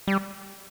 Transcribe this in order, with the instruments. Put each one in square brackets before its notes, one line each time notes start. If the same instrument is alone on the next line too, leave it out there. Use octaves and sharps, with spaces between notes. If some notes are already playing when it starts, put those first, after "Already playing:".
[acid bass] G3